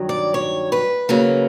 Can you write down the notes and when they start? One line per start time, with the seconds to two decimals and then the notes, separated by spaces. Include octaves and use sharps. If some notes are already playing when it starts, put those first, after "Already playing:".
Already playing: G2 D#3 F#3
0.09 D5
0.34 C#5
0.72 B4
1.09 C#3 F#3 A#3